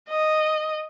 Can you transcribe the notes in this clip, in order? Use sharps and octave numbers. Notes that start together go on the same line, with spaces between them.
D#5